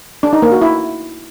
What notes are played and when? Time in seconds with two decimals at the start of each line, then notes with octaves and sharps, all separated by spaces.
0.23 D4
0.33 D#4
0.42 A#3
0.52 F#4
0.62 E4